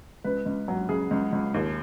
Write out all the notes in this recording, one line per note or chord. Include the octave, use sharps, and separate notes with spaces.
C#2 B4
C#2
F#3
C#3 G#4
C#2
C#2
D#2